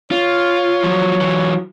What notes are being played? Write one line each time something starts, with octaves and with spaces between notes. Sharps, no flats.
F4 C#5
F3 F#3
E3 F#3